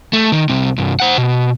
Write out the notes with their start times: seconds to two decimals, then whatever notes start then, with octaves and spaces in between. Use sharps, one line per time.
0.13 A3
0.32 D#3
0.49 C2 C3
0.78 C2 G2
1.00 C5 F#5
1.18 B2